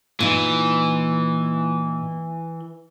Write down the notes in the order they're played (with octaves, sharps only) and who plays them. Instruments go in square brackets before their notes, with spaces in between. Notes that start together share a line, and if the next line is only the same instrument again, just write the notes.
[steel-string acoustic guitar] A#2 D#4 [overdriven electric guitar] E3